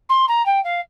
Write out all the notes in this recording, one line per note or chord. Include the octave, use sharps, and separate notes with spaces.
C6
A#5
G5
F5